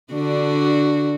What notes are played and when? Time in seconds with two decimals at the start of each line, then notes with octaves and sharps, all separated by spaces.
0.13 D3 D4 F#4